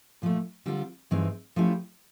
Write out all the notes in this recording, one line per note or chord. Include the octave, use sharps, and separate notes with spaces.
A#2 F3 A3
D3 G3 C4 F4
G2 E3 G#3 C4 D#4
F3 A3 C#4 E4 G4